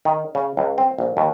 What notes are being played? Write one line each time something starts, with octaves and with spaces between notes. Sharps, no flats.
D#3
C#3
C#2
C4
A#1
D#2